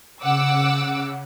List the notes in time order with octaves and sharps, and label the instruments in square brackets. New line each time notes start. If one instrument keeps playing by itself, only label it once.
[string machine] C#3 [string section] F#5 D6 E6